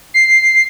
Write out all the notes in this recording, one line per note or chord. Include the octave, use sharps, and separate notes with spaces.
C7